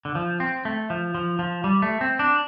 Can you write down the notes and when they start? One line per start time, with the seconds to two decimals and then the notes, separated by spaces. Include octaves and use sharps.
0.05 D3
0.15 F3
0.40 C4
0.65 A3
0.90 F3
1.15 F3
1.39 F3
1.64 G3
1.82 A3
2.01 C4
2.19 D4